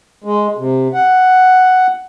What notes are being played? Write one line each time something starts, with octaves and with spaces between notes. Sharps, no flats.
G#3
C3
F#5